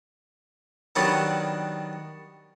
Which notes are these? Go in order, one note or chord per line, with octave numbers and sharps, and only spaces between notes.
D#3 F#3 G3 B3 D4